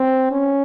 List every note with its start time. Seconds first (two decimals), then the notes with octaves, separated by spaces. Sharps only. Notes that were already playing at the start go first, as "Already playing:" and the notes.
Already playing: C4
0.31 C#4